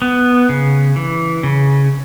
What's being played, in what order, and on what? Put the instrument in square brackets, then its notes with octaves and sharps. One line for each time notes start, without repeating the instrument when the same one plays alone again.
[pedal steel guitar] B3
C#3
E3
C#3